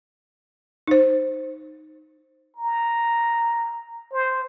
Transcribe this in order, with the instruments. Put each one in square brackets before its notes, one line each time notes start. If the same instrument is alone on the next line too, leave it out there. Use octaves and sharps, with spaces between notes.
[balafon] D#4 C5
[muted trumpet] A#5
C5